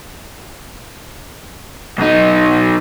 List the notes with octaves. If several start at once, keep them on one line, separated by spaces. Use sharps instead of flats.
B1 D#4